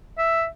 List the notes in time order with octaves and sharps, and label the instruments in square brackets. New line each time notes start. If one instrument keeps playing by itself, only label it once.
[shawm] E5